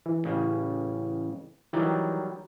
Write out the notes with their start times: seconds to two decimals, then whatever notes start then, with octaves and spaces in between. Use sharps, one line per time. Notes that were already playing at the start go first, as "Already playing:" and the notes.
0.06 E3
0.24 A1 C#3
1.73 D#3 E3 F#3 G3